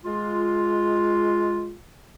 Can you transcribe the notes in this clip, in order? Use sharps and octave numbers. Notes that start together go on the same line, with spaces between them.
G#3 F4